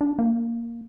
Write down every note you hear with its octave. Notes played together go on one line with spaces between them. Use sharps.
D4
A#3